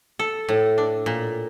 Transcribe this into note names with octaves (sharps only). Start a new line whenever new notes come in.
A4
A2
D4
A#2